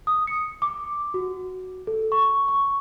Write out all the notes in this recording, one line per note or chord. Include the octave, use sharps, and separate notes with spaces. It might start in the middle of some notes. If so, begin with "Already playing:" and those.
D#6
C#7
D6
F#4
A4
C#6
C#6